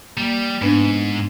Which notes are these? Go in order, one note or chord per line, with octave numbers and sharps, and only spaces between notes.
G3 A#3
G#2 B3 D4 B4